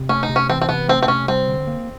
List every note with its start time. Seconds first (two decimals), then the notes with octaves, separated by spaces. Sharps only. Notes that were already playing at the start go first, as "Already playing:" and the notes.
Already playing: C3
0.09 A3 C#4
0.23 D#4
0.29 C3
0.36 C#4
0.49 E3 C4
0.61 C4
0.69 C3 B3
0.88 A3 C4
1.02 C4
1.08 C3 C#4
1.28 G3 C4
1.48 D3
1.67 A#3